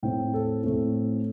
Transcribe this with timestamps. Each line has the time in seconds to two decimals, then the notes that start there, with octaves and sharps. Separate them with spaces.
0.03 A2 A3 C4 G5
0.34 A4
0.63 A2 A3 C4 A4